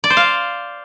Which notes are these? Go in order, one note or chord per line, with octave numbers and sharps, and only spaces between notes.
D5
C5
F5